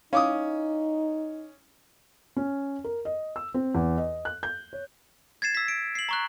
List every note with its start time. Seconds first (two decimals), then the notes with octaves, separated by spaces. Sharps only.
0.13 C#4 D#4 E4 F5 D6 D#6
2.37 C#4
2.84 A#4
3.05 D#5
3.36 E6
3.54 C4
3.75 E2
3.98 D#5
4.25 F#6
4.43 G6
4.73 C#5
5.42 G#6 A6 C7 E7
5.55 E6 B6
5.68 D7
5.95 C7 F#7
6.09 A#5 C#6 F#6